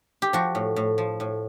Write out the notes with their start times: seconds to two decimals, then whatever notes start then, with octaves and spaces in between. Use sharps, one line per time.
0.22 G4
0.33 F3 F#4
0.55 A2
0.76 A2
0.98 F3
1.20 A2